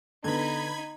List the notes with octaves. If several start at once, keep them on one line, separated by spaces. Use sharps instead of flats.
D3 B3 D#4 B5 G#6